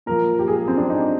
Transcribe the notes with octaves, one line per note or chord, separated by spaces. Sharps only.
A#2 F3 A#4
G4
G#4
C4
D4
D#4